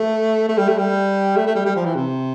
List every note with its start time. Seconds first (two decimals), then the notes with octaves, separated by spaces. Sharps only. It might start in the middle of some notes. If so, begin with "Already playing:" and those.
Already playing: A3
0.48 A3
0.58 G3
0.68 A3
0.78 G3
1.36 A3
1.47 A3
1.55 G3
1.66 G3
1.76 F3
1.85 E3
1.95 C3